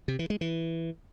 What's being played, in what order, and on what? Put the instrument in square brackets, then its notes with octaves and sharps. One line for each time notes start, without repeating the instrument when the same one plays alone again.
[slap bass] C3
E3
G#3
E3